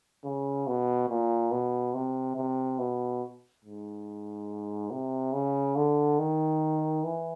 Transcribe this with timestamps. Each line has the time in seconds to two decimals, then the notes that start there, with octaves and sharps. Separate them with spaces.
0.24 C#3
0.67 B2
1.10 A#2
1.51 B2
1.94 C3
2.36 C3
2.79 B2
3.64 G#2
4.91 C3
5.33 C#3
5.75 D3
6.19 D#3
7.04 E3